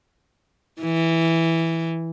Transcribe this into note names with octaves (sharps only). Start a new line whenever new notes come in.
E3